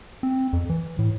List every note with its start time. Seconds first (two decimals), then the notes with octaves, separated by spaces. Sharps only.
0.23 C4
0.53 F2
0.69 E3
0.99 A2